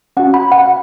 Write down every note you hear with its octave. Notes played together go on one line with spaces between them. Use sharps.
C#4 F#4 F#5
B5
F#5